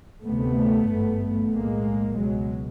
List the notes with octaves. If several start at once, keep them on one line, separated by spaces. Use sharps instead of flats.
D2 C3 A3 B3
G#1 G2
B1 A2 G#3 A#3
C#2 B2 F#3 G#3